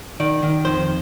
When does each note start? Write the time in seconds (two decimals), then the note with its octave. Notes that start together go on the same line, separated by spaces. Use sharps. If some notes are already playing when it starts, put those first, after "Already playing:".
0.20 D#3 D5
0.43 D#3
0.65 F2 C5